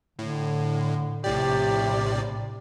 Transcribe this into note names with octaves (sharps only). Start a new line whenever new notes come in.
A2 D3
A#1 A2 C3 G4 D5